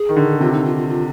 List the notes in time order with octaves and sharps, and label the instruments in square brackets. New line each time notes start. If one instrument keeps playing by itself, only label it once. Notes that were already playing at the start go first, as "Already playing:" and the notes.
Already playing: [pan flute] G#4
[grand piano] D#3
D3
[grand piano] C3 [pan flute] F4
[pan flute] D#4
F4
F4
F4